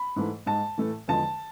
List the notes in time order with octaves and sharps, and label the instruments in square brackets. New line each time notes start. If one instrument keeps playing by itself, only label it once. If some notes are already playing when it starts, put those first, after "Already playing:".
Already playing: [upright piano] B5
G#2 E3 A3
G#2 G#3 A5
A2 E3 A3
E2 D3 F3 G#3 A5